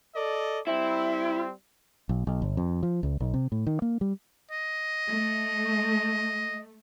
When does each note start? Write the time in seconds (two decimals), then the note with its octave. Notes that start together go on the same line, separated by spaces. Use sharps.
0.14 A4 D5 D#5
0.67 G3 C4 E4
2.09 B1
2.27 B1
2.42 G1
2.57 F2
2.83 F3
3.03 C#2
3.20 B1
3.34 C3
3.52 A2
3.67 D#3
3.82 A#3
4.01 G3
4.51 D#5
5.09 A3